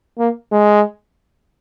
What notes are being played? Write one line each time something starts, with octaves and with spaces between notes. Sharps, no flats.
A#3
G#3